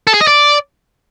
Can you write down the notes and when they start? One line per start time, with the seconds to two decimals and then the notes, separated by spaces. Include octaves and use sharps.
0.07 A4
0.14 G#4
0.21 D#5
0.27 D5